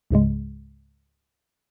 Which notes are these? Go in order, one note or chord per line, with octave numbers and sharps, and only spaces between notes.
C#2 G#2 C#3 G#3